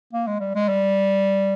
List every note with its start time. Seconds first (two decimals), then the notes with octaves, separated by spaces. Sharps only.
0.13 A#3
0.27 G#3
0.40 G3
0.55 G#3
0.69 G3